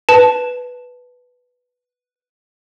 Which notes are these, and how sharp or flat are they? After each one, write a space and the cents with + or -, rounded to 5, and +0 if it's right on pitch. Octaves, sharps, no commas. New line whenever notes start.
B4 +0 A5 +0